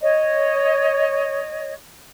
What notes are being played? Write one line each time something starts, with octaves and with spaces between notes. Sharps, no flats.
C#5 D#5